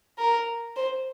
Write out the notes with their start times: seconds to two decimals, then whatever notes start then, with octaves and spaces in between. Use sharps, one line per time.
0.19 A#4
0.76 C5